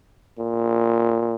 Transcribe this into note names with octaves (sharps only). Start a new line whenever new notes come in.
A#2